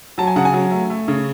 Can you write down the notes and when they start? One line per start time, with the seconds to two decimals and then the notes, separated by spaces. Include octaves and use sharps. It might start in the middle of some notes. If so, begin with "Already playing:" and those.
0.18 F#3 A5
0.27 G#5
0.36 C#3 F#5
0.45 G#5
0.53 F#3
0.71 A3
0.90 A3
1.08 C#3